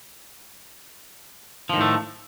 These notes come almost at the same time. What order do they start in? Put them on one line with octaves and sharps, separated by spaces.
F3 D#3 A2 A3